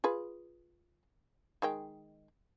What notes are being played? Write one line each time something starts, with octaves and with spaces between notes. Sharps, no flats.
F4 G#4 B4
D#3 G#3 G5